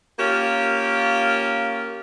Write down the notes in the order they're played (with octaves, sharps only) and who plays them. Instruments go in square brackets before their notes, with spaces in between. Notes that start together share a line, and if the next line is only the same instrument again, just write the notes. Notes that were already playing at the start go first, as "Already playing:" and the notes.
[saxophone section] A#3 C#4 F4 G4